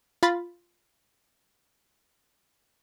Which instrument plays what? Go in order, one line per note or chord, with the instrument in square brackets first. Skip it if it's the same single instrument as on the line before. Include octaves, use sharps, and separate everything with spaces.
[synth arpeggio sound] F4 B5 A6